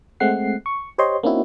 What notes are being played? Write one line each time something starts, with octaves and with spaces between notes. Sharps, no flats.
G#3 A3 C4 F#5 C7
C#6
G4 C5 C#5 D#5 C6
A#3 C4 C#4 D#4 E4 F#4